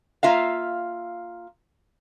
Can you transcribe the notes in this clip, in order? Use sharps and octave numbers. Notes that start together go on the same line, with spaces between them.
A#3 F4 E5 F5